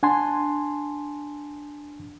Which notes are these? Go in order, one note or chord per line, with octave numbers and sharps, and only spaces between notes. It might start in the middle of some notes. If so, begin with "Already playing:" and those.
D4 F#5 G#5 A5 C6